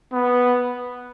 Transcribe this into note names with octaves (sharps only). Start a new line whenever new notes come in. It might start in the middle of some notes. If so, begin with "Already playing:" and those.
B3